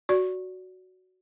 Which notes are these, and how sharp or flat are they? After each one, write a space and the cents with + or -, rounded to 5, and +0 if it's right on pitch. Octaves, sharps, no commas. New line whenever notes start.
F#4 +0 D5 -20